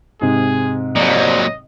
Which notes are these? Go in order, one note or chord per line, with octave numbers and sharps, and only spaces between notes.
G#2 C3 G#4
F2 A#2 F#3 G3 D#5